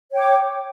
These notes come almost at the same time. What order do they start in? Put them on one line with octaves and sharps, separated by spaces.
C#5 G5 D6